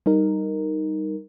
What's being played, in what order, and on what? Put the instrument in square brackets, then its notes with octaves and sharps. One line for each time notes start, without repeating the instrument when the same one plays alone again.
[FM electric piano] G3 D#4 A#4